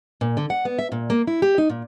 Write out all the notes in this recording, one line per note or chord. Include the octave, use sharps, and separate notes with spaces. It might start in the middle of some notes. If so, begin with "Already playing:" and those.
A#2
D3
F#5
B3
E5
A#2
A#3
E4
G4
D#4
A#2